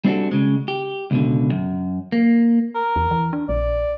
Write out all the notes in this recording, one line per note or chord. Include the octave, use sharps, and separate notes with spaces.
G3 C4 D4 F#4 A4
C#3 G#3
G4
C#2 B2 D3
F#2
A#3
A#4
E2
E3
D4
A#1 D5